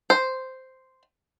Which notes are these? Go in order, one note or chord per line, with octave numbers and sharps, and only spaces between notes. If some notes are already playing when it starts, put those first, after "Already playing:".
C5